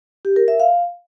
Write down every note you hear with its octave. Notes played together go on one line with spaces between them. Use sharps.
G4
A#4
E5
F5